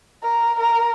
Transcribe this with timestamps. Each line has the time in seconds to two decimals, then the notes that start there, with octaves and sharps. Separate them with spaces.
0.22 A#4
0.60 A#4